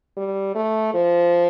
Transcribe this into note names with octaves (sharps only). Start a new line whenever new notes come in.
G3
A3
F3